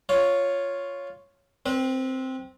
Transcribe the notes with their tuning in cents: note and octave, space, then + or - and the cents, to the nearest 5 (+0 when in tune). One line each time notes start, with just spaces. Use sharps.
F4 +0 C#5 +0
C4 +0 B4 -35